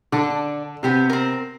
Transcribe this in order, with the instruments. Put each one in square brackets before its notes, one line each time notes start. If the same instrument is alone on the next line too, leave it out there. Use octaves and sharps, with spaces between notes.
[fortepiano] D3 [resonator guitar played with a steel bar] D4 A4
[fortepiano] C3 [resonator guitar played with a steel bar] B3 G4 C5
[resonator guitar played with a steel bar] C4 A#4